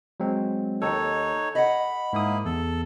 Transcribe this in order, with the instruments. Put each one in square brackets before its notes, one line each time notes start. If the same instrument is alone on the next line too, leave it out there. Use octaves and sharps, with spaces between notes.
[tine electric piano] F#3 G#3 C4
[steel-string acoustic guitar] D#2 [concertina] D#4 C#5 [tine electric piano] A4
[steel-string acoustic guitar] D#5 F#5 [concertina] B5
[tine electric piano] G#2 D#6 [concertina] A#3 E4
[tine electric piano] E2 [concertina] A4